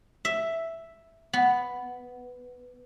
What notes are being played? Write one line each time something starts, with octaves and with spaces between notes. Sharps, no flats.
E5
B3